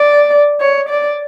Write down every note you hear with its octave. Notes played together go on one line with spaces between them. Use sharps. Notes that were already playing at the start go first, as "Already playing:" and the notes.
Already playing: D5
C#5
D5